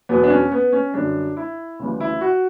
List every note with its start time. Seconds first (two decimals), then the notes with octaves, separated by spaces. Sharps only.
0.09 E2 B2 F#3 B3
0.24 D4
0.30 C#4
0.52 B3
0.73 C#4
0.94 F#2 D3 G3 D4
1.37 E4
1.79 D2 C#3 E3 G3
2.00 E4
2.21 F#4